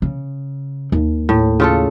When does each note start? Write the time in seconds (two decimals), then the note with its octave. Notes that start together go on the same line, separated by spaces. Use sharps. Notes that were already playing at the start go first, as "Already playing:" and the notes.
0.02 C#3
0.92 D#2
1.29 A2
1.60 C#3 F4 A4